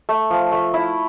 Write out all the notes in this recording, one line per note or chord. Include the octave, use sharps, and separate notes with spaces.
A3
F3
A3
E4